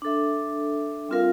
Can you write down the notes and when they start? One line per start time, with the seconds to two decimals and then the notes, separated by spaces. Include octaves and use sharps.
0.02 D4 A4 E5
1.09 G3 C4 F4 A#4 F5